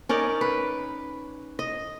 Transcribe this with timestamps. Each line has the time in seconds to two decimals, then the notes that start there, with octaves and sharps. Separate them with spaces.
0.09 C#4 D#4 A#4 D5
0.41 B4
1.59 D#5